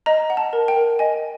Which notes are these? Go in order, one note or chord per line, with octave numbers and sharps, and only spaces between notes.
D#5 A#5
F#5
A5
A#4
G5
A#4
D#5 G#5